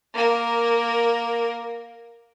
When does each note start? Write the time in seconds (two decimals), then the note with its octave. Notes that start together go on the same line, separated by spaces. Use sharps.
0.14 A#3 A#4